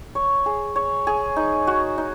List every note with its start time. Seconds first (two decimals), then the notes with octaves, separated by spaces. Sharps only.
0.15 C#5
0.46 G#4
0.76 C#5
1.07 G#4
1.36 D#4
1.67 F#4
1.98 D#4